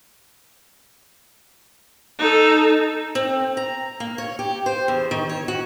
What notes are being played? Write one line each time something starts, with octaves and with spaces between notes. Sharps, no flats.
D#4 A4
C4
A#5
A#3
C#5
G4
C5
E2
D#3
C#5
F#4